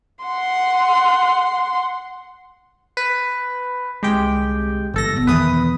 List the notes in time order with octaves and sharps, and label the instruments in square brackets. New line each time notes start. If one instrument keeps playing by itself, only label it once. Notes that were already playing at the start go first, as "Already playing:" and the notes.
[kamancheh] F#5 C6
[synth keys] B4
[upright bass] C2 D3 [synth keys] G#3 G4 G5
[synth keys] G1 A4 A#6 [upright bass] E3 G3
[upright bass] B2 B3
[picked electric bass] E2 D#3 E3 [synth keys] B4 D#6